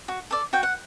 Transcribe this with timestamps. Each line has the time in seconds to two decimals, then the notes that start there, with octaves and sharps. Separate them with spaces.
0.08 F#4
0.31 A4 D5
0.53 F#4 G5
0.63 F#5